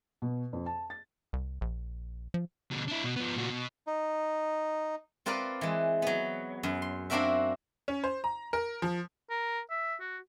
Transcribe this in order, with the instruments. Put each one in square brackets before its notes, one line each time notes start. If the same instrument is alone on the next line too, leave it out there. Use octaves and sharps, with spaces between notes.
[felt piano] B2
F2
A5
A6
[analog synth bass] C2
A#1
F3
[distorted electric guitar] B2 D3
D4 E4
B2
F3 B3
A#2 F#4
B2
[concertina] D#4
[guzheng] C4 F4 A#4 B4 D5
E3 G#3
F#3 B3
F#2
C6
A#3 C4 D4 F#4 A#4 E5
[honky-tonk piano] C#4
C5
A#5
A#4
F3
[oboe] A#4
E5
F#4